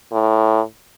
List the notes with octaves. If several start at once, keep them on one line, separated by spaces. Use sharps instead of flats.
A2